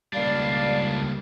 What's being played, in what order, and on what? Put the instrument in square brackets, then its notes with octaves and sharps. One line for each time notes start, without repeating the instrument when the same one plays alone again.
[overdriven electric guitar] C#2 D4 [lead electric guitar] G3 A#3 [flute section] D5 F5